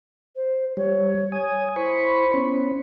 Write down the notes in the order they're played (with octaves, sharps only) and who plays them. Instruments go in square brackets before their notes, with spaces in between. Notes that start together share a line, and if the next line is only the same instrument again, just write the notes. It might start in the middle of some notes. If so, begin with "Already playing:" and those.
[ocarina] C5
[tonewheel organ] G3 [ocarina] C#5
[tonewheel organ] G#5 D#6
[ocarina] E4 [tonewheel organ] C5 B5 C#6
[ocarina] B3 [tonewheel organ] C#4